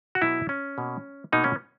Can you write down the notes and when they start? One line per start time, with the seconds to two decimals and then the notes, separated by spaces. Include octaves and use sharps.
0.15 F#4
0.22 B2 F#3 B3 E4
0.49 C#4
0.78 B2 A#3
1.32 B2 A#3 D#4
1.44 C#4